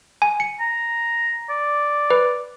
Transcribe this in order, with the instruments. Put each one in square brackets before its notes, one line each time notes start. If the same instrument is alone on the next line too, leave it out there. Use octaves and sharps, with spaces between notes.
[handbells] G#5
C#7
[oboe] A#5
D5
[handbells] B4